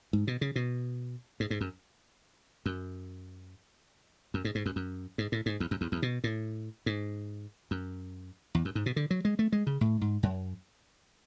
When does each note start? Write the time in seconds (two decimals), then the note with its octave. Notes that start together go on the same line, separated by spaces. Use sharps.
0.13 G#2
0.27 B2
0.41 C#3
0.56 B2
1.40 G#2
1.50 G#2
1.61 F#2
2.66 F#2
4.34 F#2
4.45 G#2
4.55 G#2
4.66 F#2
4.76 F#2
5.18 G#2
5.32 A2
5.46 G#2
5.60 E2
5.71 F#2
5.81 E2
5.92 E2
6.02 B2
6.24 A2
6.86 G#2
7.71 F#2
8.55 E2
8.65 F#2
8.75 G#2
8.86 B2
8.96 D3
9.11 F#3
9.25 G#3
9.39 A3
9.52 G#3
9.67 C#3
9.81 A2
10.01 G#2
10.23 F#2